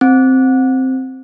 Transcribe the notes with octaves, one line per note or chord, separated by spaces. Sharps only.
C4